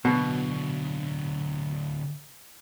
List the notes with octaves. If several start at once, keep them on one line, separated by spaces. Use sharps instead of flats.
B2 D3 F#3